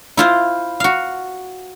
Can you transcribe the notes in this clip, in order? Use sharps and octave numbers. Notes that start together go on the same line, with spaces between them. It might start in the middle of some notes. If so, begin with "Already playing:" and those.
E4 F4 C5
F#4 F5